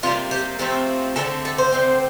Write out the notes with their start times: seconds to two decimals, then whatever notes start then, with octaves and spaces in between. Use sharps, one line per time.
0.03 C3 G3 A#3 F4
0.31 G4
0.59 C3 F3 A3 C4 A4
1.16 D3 A3 C4 A4
1.45 A4
1.58 C5
1.73 D3 A3 C4